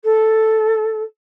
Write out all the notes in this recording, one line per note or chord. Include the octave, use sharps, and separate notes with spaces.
A4